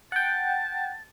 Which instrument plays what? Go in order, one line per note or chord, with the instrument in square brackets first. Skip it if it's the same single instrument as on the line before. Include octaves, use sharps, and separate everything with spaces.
[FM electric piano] F#5 G5 [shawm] A5